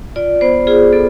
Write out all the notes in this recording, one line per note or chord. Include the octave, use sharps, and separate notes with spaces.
F4 D5
B3 C5
F4 G#4
B3 A4